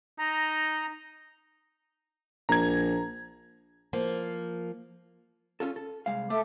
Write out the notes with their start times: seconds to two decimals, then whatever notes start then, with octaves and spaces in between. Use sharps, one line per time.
0.19 D#4 A#5
2.49 A#1 A#5 G#6
3.93 F3 A#3
5.60 C#4 F4 A4
5.76 A4
6.06 C2 G#3 F5
6.30 A3 A4 E5 D6